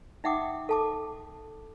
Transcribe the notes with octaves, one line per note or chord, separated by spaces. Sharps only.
D#4 E5 F#5 G5 D6 D#6
A4 A5 D6